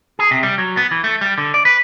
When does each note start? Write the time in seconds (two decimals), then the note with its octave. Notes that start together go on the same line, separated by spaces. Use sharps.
0.19 G#4
0.31 C3
0.43 G3
0.58 F#3
0.77 B3
0.91 E3
1.04 A3
1.21 G3
1.38 D3
1.54 D5
1.65 B4